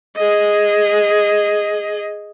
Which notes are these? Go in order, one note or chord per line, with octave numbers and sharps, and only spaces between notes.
G#4 D#5